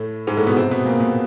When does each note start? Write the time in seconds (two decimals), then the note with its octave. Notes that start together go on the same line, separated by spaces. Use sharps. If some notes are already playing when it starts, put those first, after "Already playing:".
Already playing: A2 A3
0.27 G#2 G#3
0.37 A2 A3
0.47 B2 B3
0.57 C3 C4
0.71 B2 B3
0.85 A#2 A#3
1.00 B2 B3